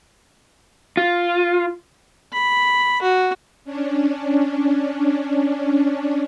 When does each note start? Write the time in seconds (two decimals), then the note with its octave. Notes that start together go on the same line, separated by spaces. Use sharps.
0.97 F4
2.33 B5
3.02 F#4
3.65 C#4 D4